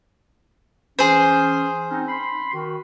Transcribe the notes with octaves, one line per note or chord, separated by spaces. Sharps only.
E3 C#4 G#4 C5
C4 C#4 D#4
B5 C6
D#3 F#4